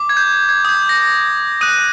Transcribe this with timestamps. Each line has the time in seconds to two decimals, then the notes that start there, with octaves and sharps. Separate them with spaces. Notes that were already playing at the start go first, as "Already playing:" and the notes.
Already playing: D6
0.09 G#6
0.17 G6
0.33 G#6
0.49 G#6
0.65 D#6 G6
0.89 A#6
1.61 D#6 F#6 D#7